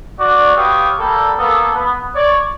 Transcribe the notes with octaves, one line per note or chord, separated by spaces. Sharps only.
F#4 D5
B3 G4 C#5 F5 C#6 D#6
G3 A#3 A4
A#3 B3 A4
B3
C#5 D5